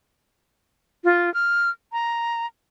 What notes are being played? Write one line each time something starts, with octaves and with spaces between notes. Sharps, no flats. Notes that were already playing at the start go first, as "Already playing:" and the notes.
F4
F6
A#5